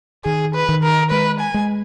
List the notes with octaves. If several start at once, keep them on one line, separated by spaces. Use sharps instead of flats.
D#3 G#4
B4
D#3
A#4
G#3 B4
G#5
G#3